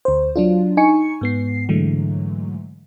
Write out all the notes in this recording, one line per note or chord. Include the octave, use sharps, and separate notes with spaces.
D2 C5
F#3 D4 F4
D#4 G#5 C#6 C#7
G#2 B3 C7
G#2 D3 E3 F#3 G#3 A3